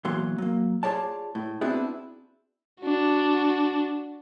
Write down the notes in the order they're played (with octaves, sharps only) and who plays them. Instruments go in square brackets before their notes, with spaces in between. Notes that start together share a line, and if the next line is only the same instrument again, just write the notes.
[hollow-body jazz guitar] E2 A#2 F#3 C6
F#3 A#3
F4 G#4 C#5 D5 A5
A2
B3 C4 D4 E4 F#4 G#4
[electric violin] D4 F#4